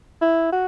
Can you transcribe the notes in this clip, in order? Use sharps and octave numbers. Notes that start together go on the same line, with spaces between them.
E4
F#4